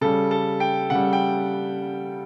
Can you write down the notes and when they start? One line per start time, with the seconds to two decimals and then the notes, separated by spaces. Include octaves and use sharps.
0.01 C#3 G3 A4
0.31 A4
0.60 G5
0.90 C#3 G3 F#5
1.13 G5